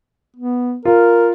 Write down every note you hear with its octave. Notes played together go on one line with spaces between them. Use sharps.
B3
F4 A#4